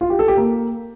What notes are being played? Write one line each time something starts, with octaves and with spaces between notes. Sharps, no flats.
F4
G4
A4
G4
A#3